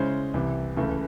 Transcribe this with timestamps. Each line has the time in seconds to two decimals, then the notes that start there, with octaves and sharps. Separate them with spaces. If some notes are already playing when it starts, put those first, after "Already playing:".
Already playing: C#3 G#3 C#4 E4 C5
0.34 C2 C3 E3
0.77 C#2 C#3 E3 A3